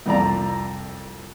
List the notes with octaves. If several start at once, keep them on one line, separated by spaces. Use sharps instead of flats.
C2 F2 F4 D5 A#5